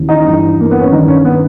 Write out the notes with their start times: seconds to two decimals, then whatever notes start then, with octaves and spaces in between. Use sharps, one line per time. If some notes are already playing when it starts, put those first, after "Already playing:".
Already playing: D#2 C#3 E3
0.09 D#4
0.25 G2 E3
0.61 A#3
0.71 B3
0.81 C#4
0.91 G2 D#3 D#4
1.08 C#4
1.25 B3